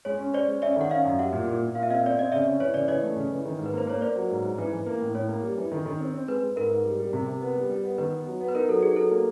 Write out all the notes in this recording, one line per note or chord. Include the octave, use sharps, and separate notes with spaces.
G#3 C#5
C#4
C#4 C5 D5
G#3
C#4 D5 E5
D#3 F#5
C#4 D#5 F5
F#2
G3 E5 F#5
A#2
A#2
A#2
A#2 F5
E5
C4 D#5 F5
C4 D5
C4 D#5
C#3 D5 E5
C#4
E3 C#5
C#3 D5
E3 C#5 D#5
A3
C#3
E3
D#3
G#2
B4
A#3 C5
A#3 C#5
A#3 C5 D5
F#3
G#2
G#2
E3
E3
A#3
A2
A2 C#5
A#3
G3
E3
D#3
D#3
C4
C4
G#3 B4
G#3
G#2 A#4
G#2
G3
G3
C3
C3
B3
G3
G3
B3
D#3 B4
B3
F#3
B3
B4
D#4 A#4
F#3 A4
D#4 G#4
F#3 A4
A#3